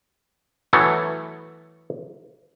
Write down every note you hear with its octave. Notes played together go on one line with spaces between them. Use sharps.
E3 F#3 A3 B3 C#5